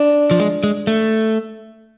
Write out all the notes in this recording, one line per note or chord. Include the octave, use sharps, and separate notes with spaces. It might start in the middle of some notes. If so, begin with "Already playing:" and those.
Already playing: D4
F3
G#3
G#3
A3